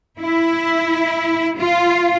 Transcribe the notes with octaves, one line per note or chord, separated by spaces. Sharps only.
E4
F4